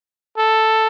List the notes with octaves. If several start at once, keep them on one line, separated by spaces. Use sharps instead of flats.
A4